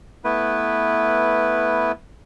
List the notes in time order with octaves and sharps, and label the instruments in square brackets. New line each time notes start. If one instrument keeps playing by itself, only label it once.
[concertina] A3 B3 E4 B4